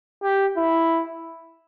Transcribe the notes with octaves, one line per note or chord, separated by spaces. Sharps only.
G4
E4